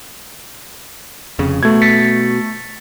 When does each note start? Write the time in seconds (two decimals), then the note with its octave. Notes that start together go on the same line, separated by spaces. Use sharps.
1.39 F1 F2 C#3
1.63 B2 A3 G#6
1.82 A6 B6 C#7